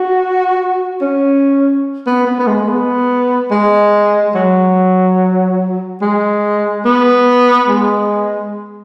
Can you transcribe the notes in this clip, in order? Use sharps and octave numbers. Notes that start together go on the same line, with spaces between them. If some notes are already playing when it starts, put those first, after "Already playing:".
Already playing: F#4
C#4
B3
B3
B3
G#3
B3
G#3
F#3
G#3
B3
G#3